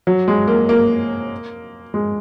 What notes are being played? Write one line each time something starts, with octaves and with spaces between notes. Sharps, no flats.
F#3
G#3
A#3
A#3
G#3